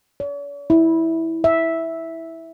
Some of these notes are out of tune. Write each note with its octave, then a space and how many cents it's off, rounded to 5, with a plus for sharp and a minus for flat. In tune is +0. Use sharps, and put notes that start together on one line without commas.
C#5 +45
E4 -15
E5 -5